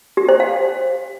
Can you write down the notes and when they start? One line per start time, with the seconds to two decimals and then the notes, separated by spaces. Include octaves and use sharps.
0.17 G4
0.29 C5
0.40 F5